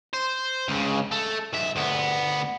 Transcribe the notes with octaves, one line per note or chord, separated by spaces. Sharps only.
C5
C#2 C#3
A3
B1 E5
D2 B3